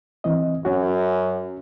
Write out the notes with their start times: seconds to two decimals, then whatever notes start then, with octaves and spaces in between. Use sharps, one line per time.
0.24 E3 C4 D#5
0.65 F#2 C#4 F#4